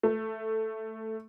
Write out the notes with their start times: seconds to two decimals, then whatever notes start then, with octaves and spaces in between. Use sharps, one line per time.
0.03 A3